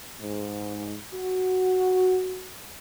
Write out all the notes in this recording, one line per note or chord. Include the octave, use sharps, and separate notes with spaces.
G#2
F#4